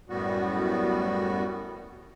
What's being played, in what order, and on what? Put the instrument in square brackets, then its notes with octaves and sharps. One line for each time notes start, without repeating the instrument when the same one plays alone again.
[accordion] F#2 A2 G3 B3 F#4